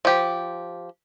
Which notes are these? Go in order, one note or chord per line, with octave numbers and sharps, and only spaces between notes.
F3 G4